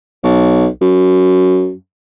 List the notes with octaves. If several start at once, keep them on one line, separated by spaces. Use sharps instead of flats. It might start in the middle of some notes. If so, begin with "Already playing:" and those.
B1
F#2